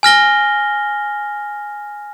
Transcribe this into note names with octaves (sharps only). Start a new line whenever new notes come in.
G#5 F6 A#6 G7